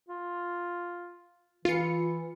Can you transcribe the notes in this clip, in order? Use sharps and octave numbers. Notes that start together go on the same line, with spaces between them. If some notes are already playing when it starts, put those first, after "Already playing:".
F4
E3 F4 C#7